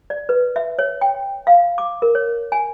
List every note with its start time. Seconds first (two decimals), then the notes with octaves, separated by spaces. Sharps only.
0.10 D5
0.29 B4
0.56 E5
0.79 C#5
1.01 G5
1.47 F5
1.78 D6
2.02 A#4
2.15 C#5
2.52 G#5